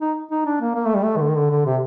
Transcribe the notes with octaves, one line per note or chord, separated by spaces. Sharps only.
D#4
D#4
D4
A#3
A#3
A3
G3
A3
D#3
D3
D#3
D3
D3
C3